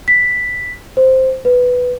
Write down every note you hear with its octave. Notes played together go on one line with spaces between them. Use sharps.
B6
C5
B4